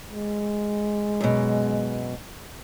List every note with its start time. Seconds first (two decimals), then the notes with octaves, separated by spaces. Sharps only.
0.11 G#3
1.20 F#2 B2